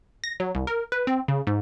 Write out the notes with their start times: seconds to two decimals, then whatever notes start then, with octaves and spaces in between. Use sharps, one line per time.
0.24 A#6
0.40 F#3
0.55 C2
0.67 A#4
0.92 B4
1.07 C4
1.28 C#3
1.47 G#2